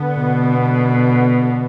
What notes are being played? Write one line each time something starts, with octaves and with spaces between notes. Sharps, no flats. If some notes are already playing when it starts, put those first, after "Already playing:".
Already playing: D3 B3
B2